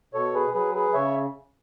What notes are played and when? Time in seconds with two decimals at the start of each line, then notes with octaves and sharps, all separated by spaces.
0.14 B2 A4 C#5
0.34 G#4 B4
0.54 F#3 G#4 B4
0.75 G#4 B4
0.94 C#3 C#5 E5